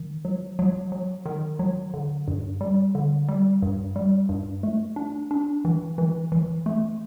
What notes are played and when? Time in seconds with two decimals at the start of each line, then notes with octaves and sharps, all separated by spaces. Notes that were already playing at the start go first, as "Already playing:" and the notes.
Already playing: D#3
0.25 F#3
0.59 F#3
0.92 F#3
1.26 D#3
1.59 F#3
1.94 D3
2.28 G2
2.61 G3
2.95 D3
3.29 G3
3.62 G2
3.96 G3
4.29 G2
4.63 A3
4.96 D4
5.31 D4
5.65 E3
5.98 E3
6.32 E3
6.66 A3